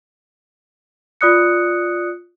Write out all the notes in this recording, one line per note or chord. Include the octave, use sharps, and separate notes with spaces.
F4 D5 D#6 F#6 C#7